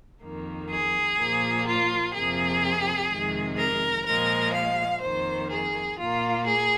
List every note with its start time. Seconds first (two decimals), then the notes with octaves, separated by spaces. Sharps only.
0.22 F2 D#3 A#3
0.70 G#4
1.19 A#2 F3 A#3
1.67 F4
2.14 F2 C3 F3 A#3 G#4
3.10 F2 C3 D#3 G#3
3.58 A#4
4.07 A#2 F3 G#3 A#4
4.54 F5
5.03 F2 D#3 A#3 C5
5.51 G#4
5.99 A#2 A#3 F4
6.47 G#4